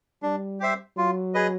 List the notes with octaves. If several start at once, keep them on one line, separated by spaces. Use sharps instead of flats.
G3 D4
G4 C5 E5
F#3 F4
G#4 B4 D#5